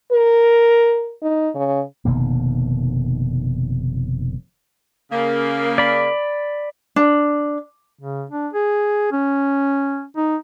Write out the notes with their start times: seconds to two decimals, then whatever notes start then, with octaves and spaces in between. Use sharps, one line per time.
0.12 A#4
1.22 D#4
1.55 C#3
2.05 F1 B2 D#3 A#3
5.11 C#3 A#3
5.78 D5 B5
6.96 D4
8.00 C#3
8.30 D4
8.53 G#4
9.12 C#4
10.16 D#4